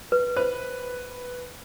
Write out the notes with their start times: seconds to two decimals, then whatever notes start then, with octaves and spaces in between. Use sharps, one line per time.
0.12 B4
0.37 B4 C5